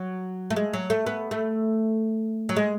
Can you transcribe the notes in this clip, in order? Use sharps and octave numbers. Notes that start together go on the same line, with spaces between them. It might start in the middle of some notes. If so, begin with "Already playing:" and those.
Already playing: F#3
A3
G#3
F#3
A3
B3
A3
F#3
G#3